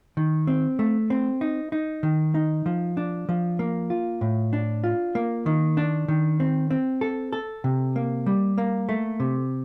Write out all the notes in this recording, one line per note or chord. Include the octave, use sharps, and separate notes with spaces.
D#3
C4
A3
C4
D#4
D#4
D#3
D#4
F3
D4
F3
A#3
F4
A2
D4
F4
A#3
D#3
D4
D#3
C4
C4
A4
A4
C3
A#3
G3
A#3
A3
C3